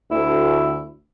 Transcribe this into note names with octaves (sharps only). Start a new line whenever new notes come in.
D2 E4